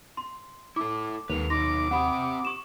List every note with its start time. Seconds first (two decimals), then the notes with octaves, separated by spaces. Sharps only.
0.17 C6
0.76 E4 A4 D6
1.30 D#2 G#3 A4 B4 F7
1.50 F#3 D#4 C6 D6 A#6
1.91 C4 G4 C5 F#5 B5 D#6
2.45 C#6 E7